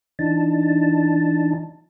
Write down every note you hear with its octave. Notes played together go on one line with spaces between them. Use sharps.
E3 D4 D#4 A5